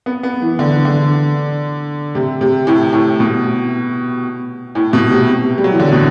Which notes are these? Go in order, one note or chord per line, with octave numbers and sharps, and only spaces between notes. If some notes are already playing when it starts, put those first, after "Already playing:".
B3
B3
E3
D3
D3
C3
C3
A2
A2
B2
A2
B2
C3
G3
F#3
E3
D3
B2